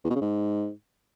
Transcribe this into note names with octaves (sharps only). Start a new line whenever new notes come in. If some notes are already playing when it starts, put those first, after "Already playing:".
E2
B2
C#3
G#2